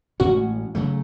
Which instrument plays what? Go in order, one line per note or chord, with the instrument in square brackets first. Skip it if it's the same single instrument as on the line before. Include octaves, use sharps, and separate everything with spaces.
[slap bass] A1 A2 G#3 C#4 [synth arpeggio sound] F#4
[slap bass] C#3 F#3 A3